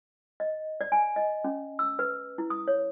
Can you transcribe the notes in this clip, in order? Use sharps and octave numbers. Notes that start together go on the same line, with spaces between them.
D#5
D5
G#5
D#5
C#4
E6
B4
E4
D#6
C#5